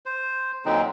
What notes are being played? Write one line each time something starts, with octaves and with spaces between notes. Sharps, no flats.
C5
A#2 D3 F#3 C4 D#4